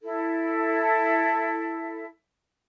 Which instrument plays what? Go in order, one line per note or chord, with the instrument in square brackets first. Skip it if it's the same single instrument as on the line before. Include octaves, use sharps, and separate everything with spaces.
[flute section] E4 A4